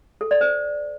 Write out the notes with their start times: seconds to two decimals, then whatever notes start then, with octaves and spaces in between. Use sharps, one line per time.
0.21 A4
0.31 D5
0.41 C5